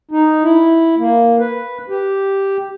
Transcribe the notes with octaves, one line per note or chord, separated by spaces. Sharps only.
D#4
E4
A#3
B4
G4